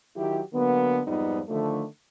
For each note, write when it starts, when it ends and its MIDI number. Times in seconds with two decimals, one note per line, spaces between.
0.16 0.41 51
0.16 0.41 54
0.16 0.41 64
0.16 0.41 67
0.53 1.01 50
0.53 1.01 54
0.53 1.01 58
0.53 1.01 59
1.07 1.41 41
1.07 1.41 44
1.07 1.41 53
1.07 1.41 55
1.07 1.41 59
1.07 1.41 63
1.49 1.85 50
1.49 1.85 51
1.49 1.85 53
1.49 1.85 57